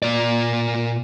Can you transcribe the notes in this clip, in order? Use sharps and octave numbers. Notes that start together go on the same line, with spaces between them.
A#2 D5